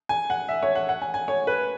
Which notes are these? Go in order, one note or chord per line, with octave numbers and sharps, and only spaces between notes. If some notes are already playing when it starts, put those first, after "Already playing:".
G#5
F#5
E5
C#5
F#5
F#5
G#5
G#5
C#5
B4